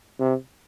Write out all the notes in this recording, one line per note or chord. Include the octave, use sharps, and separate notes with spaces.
C3